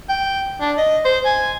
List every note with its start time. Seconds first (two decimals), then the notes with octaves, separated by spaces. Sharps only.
0.09 G5
0.61 D4
0.78 D#5
1.05 C5
1.25 G#5